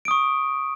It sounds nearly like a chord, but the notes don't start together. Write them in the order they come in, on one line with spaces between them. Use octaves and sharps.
D7 D#6 C#6